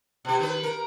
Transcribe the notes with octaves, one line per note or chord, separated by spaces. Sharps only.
B2 G4
D#3 B4
A#4